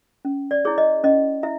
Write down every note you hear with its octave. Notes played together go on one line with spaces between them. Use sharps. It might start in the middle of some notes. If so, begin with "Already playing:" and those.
C#4
D5
E4 G#4 C#5
D#5
C#4 D#5
E4 E5